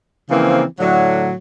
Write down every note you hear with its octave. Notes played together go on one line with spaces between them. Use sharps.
C#3 E3 F3 A#3 C4
A2 D3 F#3